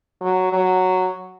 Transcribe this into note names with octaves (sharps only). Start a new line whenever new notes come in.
F#3
F#3